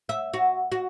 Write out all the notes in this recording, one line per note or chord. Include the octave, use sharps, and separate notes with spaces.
E5
F#4
F#4